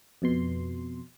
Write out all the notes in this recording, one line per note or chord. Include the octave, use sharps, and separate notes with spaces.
F2 B2 C6